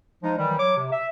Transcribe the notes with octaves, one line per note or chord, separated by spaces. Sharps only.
F3 G#3 D#4
D#3 E3 F#3 G3
F#3 C#5 D6
C3
E5